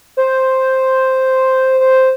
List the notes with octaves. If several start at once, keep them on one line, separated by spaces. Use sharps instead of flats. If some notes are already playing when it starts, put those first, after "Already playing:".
C5
C5